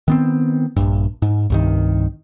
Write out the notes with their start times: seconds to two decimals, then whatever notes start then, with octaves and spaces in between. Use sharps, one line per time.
0.08 D#3 B3 C4
0.76 A#1 G2
1.22 G#2
1.50 C2 G2 D#3